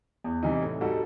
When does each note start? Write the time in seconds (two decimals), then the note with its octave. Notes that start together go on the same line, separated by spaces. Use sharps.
0.24 E2
0.43 C3 E3 G3 D#4
0.62 A2
0.81 G3 D#4 F#4 A4